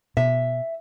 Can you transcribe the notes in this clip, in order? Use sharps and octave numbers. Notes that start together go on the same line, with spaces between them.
B2 E5